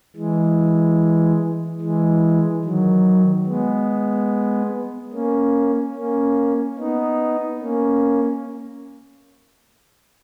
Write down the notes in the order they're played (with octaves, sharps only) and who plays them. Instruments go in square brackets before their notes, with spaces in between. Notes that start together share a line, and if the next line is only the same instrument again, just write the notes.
[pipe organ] E3 G#3
E3 G#3
D#3 F#3
G#3 B3
A#3 C#4
A#3 C#4
B3 D#4
A#3 C#4